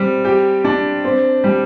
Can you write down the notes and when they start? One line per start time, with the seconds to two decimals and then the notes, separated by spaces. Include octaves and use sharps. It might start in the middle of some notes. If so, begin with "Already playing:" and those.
Already playing: G3 C4
0.25 G4
0.65 D4
1.04 C4
1.44 G3